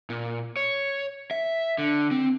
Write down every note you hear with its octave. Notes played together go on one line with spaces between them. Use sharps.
A#2
C#5
E5
D3
C4